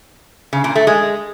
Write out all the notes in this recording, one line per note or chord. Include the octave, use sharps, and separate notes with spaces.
C#3
A#2
A3
G#3